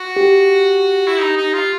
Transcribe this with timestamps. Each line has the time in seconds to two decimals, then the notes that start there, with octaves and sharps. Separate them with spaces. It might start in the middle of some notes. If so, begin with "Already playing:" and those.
Already playing: F#4
0.17 G4
1.07 E4
1.19 D#4
1.37 D#4
1.54 F4